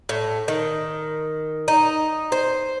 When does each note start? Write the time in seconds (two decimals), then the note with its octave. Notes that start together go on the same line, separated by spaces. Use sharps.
0.09 A2
0.48 D#3
1.68 D#4
2.32 C5